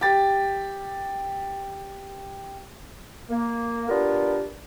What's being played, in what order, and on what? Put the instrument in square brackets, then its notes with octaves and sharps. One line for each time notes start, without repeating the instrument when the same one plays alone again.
[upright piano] G4 A6
[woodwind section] A#3
B3 D4 F4 G4 A#4